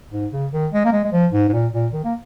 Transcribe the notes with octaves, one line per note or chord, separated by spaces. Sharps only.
G#2
C#3
D#3
G#3
A#3
G#3
G#3
F3
G#2
G#2
A#2
A#2
D#3
A#3